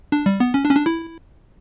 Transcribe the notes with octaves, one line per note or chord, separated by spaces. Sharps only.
D4
G3
B3
C#4
D4
C#4
D4
E4